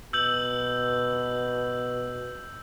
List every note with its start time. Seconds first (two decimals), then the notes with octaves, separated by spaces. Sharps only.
0.13 B2 E6 G6 F#7